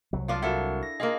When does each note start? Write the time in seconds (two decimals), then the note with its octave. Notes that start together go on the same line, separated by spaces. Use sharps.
0.13 C2 F#3
0.28 F3 D4 F4
0.42 E4 F#4 A4 A#4 F#5
0.83 A#6
1.00 A#3 F4 G#4 D#5 F5